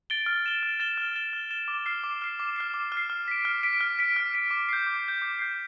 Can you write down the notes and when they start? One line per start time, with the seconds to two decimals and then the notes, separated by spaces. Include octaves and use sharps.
0.10 A6 D7 G7
0.26 F6
0.45 A6 E7 G7
0.63 F6
0.80 A6 E7 G7
0.98 F6
1.15 A6 E7 G7
1.33 F6
1.51 A6 E7 G7
1.68 D6
1.86 F6 C7
2.04 D6
2.22 F6 C7
2.40 D6
2.56 F6 C7
2.74 D6
2.92 F6
2.97 C7
3.10 F6
3.28 B6 D7
3.45 F6
3.63 B6 D7
3.81 F6
3.99 B6 D7
4.16 F6
4.34 B6 D7
4.51 D6
4.69 G6 C7
4.87 D6
5.04 G6 C7
5.22 D6
5.39 G6 C7